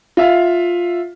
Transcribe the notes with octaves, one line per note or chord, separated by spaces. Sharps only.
F4 E5 F5